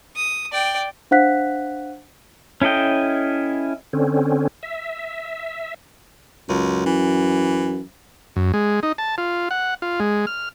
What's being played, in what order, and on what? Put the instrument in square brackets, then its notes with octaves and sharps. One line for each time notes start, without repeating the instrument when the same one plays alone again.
[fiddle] D#6
D5 G5
[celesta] D4 C5 F5 F#5 F#6 B6
[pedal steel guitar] C#4 E4 A4 D#5 G5
[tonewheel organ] D3 C4 C#4
E5
[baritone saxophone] C#2 [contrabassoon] F#2
[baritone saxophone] E3
[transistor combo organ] F#2
G#3
D#4
A5
F4
F#5
F4
G#3
F6